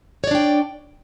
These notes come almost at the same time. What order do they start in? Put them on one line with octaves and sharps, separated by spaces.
C#5 D5 D4 G5